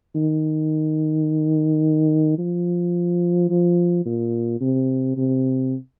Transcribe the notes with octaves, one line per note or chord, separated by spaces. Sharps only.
D#3
F3
F3
A#2
C3
C3